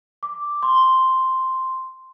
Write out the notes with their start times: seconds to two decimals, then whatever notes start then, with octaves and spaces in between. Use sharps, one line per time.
0.23 D6
0.63 C6